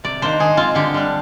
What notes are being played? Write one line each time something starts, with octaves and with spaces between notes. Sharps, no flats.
C3 D5
D#3 A#3 D4 C5
D#3 G#4
G#3 C4 F4
D3 G4
G3 D4